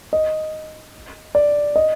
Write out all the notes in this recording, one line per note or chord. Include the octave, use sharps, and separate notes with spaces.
D#5
D5
D#5